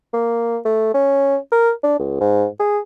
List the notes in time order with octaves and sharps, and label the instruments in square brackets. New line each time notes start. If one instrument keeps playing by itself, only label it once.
[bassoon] A#3
A3
C#4
A#4
D4
C#2
G#2
G#4